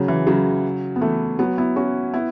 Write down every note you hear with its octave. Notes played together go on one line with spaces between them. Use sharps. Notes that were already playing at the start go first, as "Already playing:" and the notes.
Already playing: C#3 F#3
E3
C#3 F#3
B3
E3 A3
F#3 B3
B3 E4
C#4 F#4
B3 E4